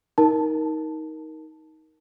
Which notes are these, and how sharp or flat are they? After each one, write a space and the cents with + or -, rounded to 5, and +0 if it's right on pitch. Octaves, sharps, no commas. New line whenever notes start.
D#4 +20 A#4 +5 A5 +0